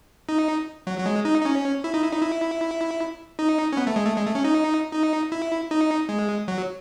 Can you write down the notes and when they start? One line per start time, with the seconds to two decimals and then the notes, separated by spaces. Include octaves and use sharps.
0.29 D#4
0.87 F#3
0.98 F#3
1.06 G#3
1.25 D#4
1.41 D#4
1.45 C#4
1.84 E4
1.94 D#4
2.02 E4
2.13 D#4
2.22 E4
3.39 D#4
3.73 C#4
3.77 B3
3.87 A3
3.96 G#3
4.06 A3
4.16 G#3
4.26 A3
4.35 C#4
4.44 D#4
4.93 D#4
5.32 E4
5.71 D#4
6.09 G#3
6.48 F#3